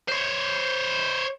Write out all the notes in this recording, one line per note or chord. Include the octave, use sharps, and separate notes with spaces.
C5 C#5